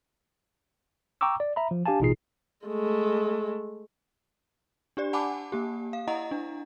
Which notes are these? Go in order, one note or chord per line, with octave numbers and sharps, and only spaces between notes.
G5 A#5 C#6 D6 E6
D5
E5 A#5 B5
F3
D4 G4 F5 G#5 A5
A1 B2 D#4 F4 G#4 C7
G#3 A3
D4 G4 D5
F#5 G#5 A5 B5 D6
A#3 G4
F5
E4 D#5 F#5 A#5
D4